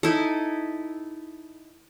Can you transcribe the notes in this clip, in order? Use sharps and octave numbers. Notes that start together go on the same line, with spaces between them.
D#4 E4 A4